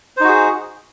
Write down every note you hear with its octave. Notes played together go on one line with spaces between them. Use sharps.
D#4 F#4 G#4 C5